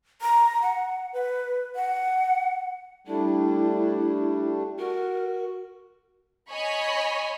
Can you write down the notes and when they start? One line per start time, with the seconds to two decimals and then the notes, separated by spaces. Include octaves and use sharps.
0.22 A#5
0.62 F#5
1.13 B4
1.76 F#5
3.07 G3 A3 D4 E4
4.79 F#4 A#4
6.50 C#5 D#5 G#5 B5 C#6